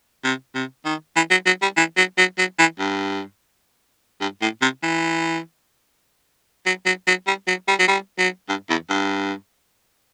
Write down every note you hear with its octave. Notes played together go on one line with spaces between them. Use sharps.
C3
C3
D#3
E3
F#3
F#3
G3
E3
F#3
F#3
F#3
E3
G2
G2
A2
C3
E3
F#3
F#3
F#3
G3
F#3
G3
F#3
G3
F#3
G2
E2
G2